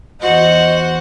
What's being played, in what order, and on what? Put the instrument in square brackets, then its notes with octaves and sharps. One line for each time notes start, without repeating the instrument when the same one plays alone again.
[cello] E2 F#4 [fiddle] C5 F#5 [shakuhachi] D#5